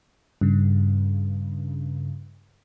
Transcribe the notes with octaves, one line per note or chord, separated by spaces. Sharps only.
G2 C#3